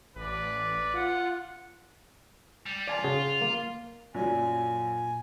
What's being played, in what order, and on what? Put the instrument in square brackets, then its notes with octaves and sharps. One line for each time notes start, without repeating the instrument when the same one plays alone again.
[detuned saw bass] A1 [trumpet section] B4 D5
[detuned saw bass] F4 [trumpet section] F#5
[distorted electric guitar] G3
[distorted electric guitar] F4 [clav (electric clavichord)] D5 G#5 A5
[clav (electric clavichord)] C#3 F#4 G#4
A#3
[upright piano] F#2 F#3 [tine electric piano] A#2 [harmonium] G#5